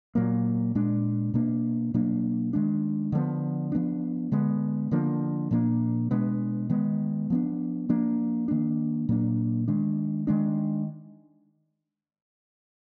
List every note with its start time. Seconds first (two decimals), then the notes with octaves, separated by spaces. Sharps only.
0.15 A#2 F#3 A#3
0.75 A#2 G#3 D4
1.34 B2 A#3 D4
1.94 B2 F#3 A#3 D4
2.53 D#3 G#3 D4
3.12 D3 F3 G#3 B3
3.72 F3 B3 D4
4.32 D3 G#3 B3
4.91 D3 F3 A#3 D4
5.51 A#2 F3 A#3 D4
6.11 B2 G#3 B3 D4
6.69 D#3 G#3 B3
7.30 F3 B3 D4
7.89 F3 A#3 D4
8.48 D#3 A#3 D4
9.09 A#2 F#3 A#3 D4
9.68 D#3 G#3 D4
10.27 D#3 G#3 D4